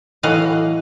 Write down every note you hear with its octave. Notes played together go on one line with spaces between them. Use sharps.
A2 E3 F#3 D#5 F5 F#5